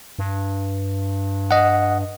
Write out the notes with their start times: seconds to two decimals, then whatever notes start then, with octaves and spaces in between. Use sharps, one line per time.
0.19 G2
1.51 D#5 F#5